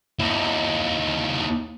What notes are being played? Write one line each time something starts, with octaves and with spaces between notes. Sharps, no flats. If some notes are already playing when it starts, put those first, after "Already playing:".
D#2 E4